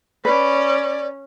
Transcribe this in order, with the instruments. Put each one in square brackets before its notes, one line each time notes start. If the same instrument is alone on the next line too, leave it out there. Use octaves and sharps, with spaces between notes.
[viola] C#4 [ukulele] B4 [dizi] D5